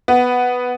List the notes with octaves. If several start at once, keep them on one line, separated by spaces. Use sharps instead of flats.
B3